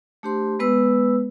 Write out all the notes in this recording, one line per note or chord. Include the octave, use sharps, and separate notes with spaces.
A3 D4 G4 C5 C6
G#3 B3 B4 E6